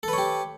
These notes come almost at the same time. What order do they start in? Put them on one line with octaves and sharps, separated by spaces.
A4 B4 C#5 G4